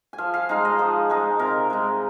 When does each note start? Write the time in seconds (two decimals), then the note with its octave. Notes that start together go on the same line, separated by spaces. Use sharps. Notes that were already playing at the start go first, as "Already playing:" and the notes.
0.13 G#5
0.18 F3 F5
0.34 F5
0.49 G#3 D#4 F5
0.65 D#5
0.79 F3 G#4
1.10 G#3 D#4
1.39 C3 A#4
1.70 G#3 D#4